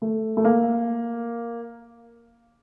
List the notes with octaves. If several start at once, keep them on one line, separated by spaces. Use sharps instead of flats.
A3
A3
A#3